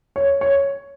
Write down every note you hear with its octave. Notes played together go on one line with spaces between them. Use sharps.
C#5
C#5